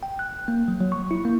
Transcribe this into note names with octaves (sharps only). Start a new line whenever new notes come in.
G5
F#6
A#3
F#3
F#3
C#6
E4
A#3